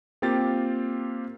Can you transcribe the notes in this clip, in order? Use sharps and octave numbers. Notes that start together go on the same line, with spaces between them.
A#3 C4 F4 G4 A6